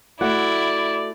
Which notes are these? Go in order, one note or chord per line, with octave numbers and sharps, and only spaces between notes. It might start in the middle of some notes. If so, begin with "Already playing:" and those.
A3 E4 F#4 D5 F#5